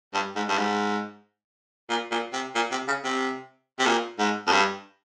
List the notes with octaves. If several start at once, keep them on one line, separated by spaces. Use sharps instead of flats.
G2
G#2
G2
G#2
A#2
A#2
C3
A#2
C3
C#3
C3
C3
A#2
G#2
F2
G2